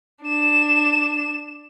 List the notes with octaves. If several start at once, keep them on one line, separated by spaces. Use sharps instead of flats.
D4 E7